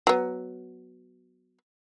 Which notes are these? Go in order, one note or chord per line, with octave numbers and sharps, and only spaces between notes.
F#3 B3